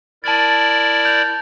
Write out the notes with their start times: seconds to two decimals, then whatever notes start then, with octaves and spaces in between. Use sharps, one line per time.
0.24 E4 A#4 D5 A5 A6
1.05 G6 F7